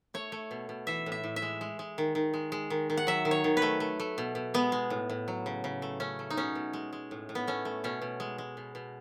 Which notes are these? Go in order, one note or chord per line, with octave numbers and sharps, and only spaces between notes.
A3 C#5
A3
B2
B2
E3 E5
A2
E5
A2
E5
G#3
G#3
G#3
D#3
D#3
G#3
G#3
D#3
D#3
F#5
F#3 E5
D#3
C#5
D#3
B4
A3
A3
A3
B2
B2
G#3 B3
G#3
A2
A2
F#3
C#3
C#3
A3
A3 C#4
A3
D#4
B2 C#4
B2
G#3
G#3
A2
A2
B3
A3 C#4
A3
B2 C#4
B2
G#3
G#3
B2
B2